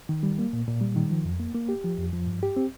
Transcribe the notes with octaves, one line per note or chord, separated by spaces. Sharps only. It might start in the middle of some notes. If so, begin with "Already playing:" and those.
D#3
G3
A#3
A#2
A#2
G3
D#3
F3
F2
A#3
A#3
G4
F3
F2
F3
G2
G4
C4